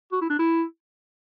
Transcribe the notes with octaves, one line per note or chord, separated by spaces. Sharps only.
F#4
E4
D4
E4